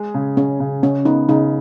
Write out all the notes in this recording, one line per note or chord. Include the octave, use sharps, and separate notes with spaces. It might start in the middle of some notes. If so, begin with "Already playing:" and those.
Already playing: G#3 G#4
C#3
C#3 C#4
C#3
C#3 C#4
B3 D#4
C#3 D#4